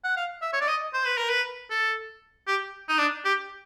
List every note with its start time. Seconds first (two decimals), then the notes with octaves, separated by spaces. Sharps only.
0.04 F#5
0.17 F5
0.42 E5
0.53 C#5
0.61 D5
0.68 D#5
0.93 C5
1.06 B4
1.17 A#4
1.29 B4
1.70 A4
2.48 G4
2.89 D#4
2.98 D4
3.25 G4